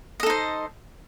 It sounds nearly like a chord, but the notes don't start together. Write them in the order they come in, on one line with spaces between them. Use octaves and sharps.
D#5 A4 D#4 C5